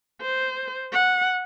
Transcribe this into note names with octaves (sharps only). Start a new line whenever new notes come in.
C5
F#5